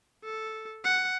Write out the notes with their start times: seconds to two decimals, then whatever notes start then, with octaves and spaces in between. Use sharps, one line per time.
0.24 A4
0.84 F#5